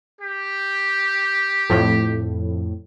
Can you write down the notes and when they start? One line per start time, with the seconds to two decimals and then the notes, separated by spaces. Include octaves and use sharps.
0.21 G4
1.70 F2 A2